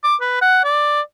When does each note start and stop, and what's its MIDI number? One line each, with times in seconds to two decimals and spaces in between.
0.04 0.16 86
0.21 0.39 71
0.42 0.63 78
0.64 1.01 74